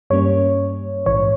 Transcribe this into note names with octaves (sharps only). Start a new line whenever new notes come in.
G2 G3 A#3 C#4 C#5
A#1 G#2 E3 C#5